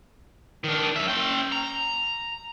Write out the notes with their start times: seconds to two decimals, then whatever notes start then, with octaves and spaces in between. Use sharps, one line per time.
0.64 D#3 D4
0.96 F#2 E5
1.08 C#4 G5
1.52 A#5